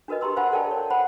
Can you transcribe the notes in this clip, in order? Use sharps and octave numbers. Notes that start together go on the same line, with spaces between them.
D4 F#4 A#4 B4 D#5
G4 A#5 C6 E6
C5 F5 F#5 G#5 B5
A4 A#4 D5 G5 A5
C#5
C5 F#5 B5